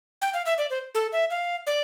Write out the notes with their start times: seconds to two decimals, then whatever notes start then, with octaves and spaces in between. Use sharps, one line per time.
0.22 G5
0.34 F5
0.46 E5
0.58 D5
0.70 C5
0.95 A4
1.12 E5
1.30 F5
1.67 D5